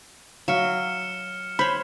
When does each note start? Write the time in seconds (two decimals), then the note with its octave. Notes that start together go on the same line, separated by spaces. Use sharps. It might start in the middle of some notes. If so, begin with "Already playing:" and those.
0.48 F#3 E5 F5 F6 C#7 E7
1.59 C5 C#5 B5